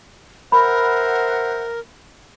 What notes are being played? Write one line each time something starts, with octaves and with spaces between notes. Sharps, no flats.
A#4 C5 E5 F#5 B5